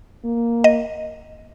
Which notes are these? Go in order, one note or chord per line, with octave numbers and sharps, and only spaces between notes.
A#3
D#5